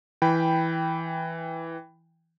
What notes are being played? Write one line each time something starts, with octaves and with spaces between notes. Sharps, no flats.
E3 G5 B5